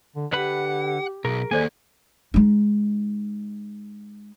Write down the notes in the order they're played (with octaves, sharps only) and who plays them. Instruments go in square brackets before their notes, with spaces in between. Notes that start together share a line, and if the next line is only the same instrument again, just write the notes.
[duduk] D3
[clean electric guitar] D3 B4 B5 [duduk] G4 [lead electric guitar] F#5
[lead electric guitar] B1 [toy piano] G#4 [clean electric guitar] A#4
[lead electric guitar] D#3 A#3 [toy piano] A4 C5 D5 [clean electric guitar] G#5
[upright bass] G#3 D#4